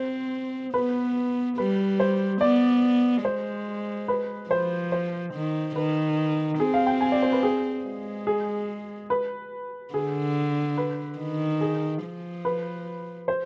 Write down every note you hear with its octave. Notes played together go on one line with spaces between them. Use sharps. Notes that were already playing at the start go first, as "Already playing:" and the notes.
Already playing: C4 C5
B3 B4
G3 B4
C5
B3 D5
G#3 C5
B4
F3 C5
C5
D#3
D#3 B4
C4 G#4
F5
G5
G#5
D5
C5
B4
G#4
G#3
G#4
B4
D3 G#4
B4
D#3
G#4
F3
B4
C5